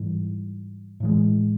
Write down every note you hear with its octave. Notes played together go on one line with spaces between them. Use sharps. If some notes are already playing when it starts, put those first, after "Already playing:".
Already playing: G#2 E3 G3
A2 E3 G#3